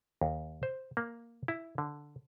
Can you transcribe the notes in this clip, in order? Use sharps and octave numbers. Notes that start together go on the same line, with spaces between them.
D#2
C5
A#3
E4
D3